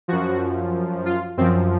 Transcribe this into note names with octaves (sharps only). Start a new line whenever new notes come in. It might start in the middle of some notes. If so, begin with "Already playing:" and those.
F#2 F3 F#4
F4
F#2 F3 C4